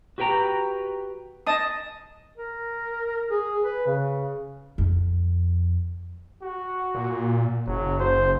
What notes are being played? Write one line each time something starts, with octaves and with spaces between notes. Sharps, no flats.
F#4 G4 B4 G5 A#5
D#5 A5 D#6
A#4
G#4
B4
C#3
F2
F#4
A#2
F#1 F#3
C5